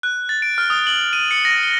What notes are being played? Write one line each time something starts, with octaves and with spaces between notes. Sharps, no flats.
F#6
A6
D7
F6
D#6
F#7
D#7
C#7
A#6
G7